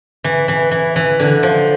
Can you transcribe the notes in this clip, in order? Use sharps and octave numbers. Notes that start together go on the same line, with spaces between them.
E3
E3
E3
E3
D3
F3